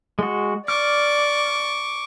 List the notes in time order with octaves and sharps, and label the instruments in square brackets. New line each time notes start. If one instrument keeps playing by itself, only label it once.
[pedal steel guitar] G#3 F#4
[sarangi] D5 [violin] C#6 D6 [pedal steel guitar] F6